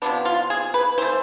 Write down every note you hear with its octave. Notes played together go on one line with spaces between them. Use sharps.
C3 F3 B3 D4
F4
G#4
B4
E3 A3 C5